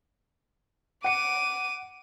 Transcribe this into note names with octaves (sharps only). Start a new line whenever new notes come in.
F#5 D6 C#7 D#7